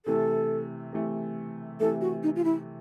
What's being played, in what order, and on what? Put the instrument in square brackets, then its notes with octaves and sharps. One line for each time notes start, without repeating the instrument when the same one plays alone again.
[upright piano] C3 E3 A3 [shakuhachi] A4
[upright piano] C3 E3 A3
[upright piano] C3 E3 A3 [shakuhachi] A4
[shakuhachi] F#4
D#4
F4
E4